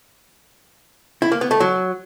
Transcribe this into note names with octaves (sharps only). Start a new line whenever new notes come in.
E4
A#3
B3
A3
F#3